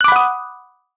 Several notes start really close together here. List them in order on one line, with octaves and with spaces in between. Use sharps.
F#6 D6 B5 F#5 D#6